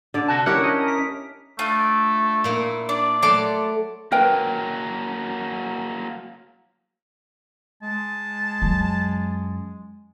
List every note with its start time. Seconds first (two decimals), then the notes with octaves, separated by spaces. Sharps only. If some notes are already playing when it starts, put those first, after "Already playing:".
0.14 D3 D5
0.28 C3 F#4 A5
0.46 C#4 E4 G4 A#4 C#5 F#5
0.64 D#5
0.88 B6
1.59 A3 D4 F4
2.44 A#2 A#3 E4
2.89 D4 D5
3.22 F#3 A3 A5 C6 D6
4.12 F#3 A#3 A#4 B4 G5
7.82 G#3 A5
8.62 F#2 F#3